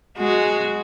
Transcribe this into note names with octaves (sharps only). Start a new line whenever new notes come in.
G#3 F#4